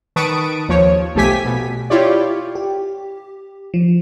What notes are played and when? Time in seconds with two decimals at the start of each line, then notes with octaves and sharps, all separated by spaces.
0.16 D#3 B4 A5 C#6 D#6 D7
0.69 D#2 F3 C#5
1.15 B1 F3 A3 G4 G#5 B6
1.45 B2
1.90 E4 F4 G4 C#5 D5
2.55 G4
3.74 F3